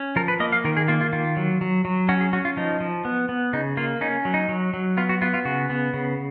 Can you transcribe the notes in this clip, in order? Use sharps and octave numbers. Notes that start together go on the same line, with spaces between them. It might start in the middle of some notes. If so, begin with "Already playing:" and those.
Already playing: C#4
F3 A#4
B4
A#3 D#5
F5
D#3 A#4
G#4
A#3 F4
F4
D#3 F4
F#3
F#3
F#3
C#4 F#4
G#4
C#4 F#4
F4
F3 D#4
F3
B3
B3
C#3 D#4
A#3 F4
C#4 D#4
F#3
D#4
F#3
F#3
B3 F4
F#4
B3 F4
F4
C#3 F#4
B3
C#3